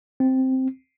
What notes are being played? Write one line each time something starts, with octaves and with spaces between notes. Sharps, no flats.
C4